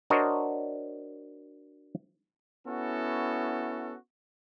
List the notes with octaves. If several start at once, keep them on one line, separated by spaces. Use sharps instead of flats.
D4 F#4 A#4 C5 C#5 D#5
B3 C#4 E4 F#4 A4